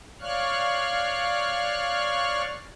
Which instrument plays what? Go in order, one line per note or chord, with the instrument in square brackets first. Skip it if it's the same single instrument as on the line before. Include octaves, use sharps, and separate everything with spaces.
[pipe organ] C#5 D5 F5 C#6 F6 F#6